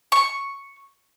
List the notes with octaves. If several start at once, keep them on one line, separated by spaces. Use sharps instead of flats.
C#6